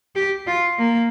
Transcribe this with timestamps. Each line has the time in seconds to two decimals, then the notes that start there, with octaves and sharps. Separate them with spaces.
0.16 G4
0.47 F4
0.79 A#3